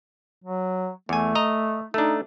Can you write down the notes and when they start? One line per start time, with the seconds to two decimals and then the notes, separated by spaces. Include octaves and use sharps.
0.44 F#3
1.09 E2 A3 G#5
1.35 D#5 A#5
1.94 A3 D4 D#4